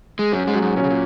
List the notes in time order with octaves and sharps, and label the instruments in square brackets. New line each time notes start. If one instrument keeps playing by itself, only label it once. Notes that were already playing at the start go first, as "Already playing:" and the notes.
[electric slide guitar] G#3
[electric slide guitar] F#2 F#3 [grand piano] C#4
[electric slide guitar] G#2 G#3
[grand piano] F#3
[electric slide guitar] G#2
[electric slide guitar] A#2 [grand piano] C#4
[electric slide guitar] C#3
A#2